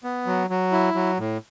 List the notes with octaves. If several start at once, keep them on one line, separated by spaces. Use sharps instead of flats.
B3
F#3
F#3
E4
F#3
A2